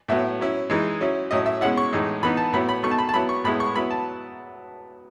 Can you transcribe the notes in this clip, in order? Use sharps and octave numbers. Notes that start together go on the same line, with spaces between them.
A2 F#3 B3 E4 E5
F#3 C#4 E4
E3 G#3 D#4
F#3 C#4 E4
A2 F#3 C#4 E4 D#5
E5
B2 G#3 C#4 E4 F#5
C#6
A2 E3 G#3 D#4
E3 B3 D#4 B5
A5
A2 F#3 B3 E4 B5
B5
B2 A3 D#4 C#6
A5
B5
A5
F#3 B3 E4 B5
C#6
A2 G#3 B3 E4 B5
C#6
F#3 B3 E4 B5
A5